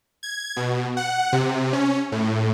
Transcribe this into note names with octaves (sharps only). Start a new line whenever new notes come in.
G#6
B2
F#5
C3
C#4
A2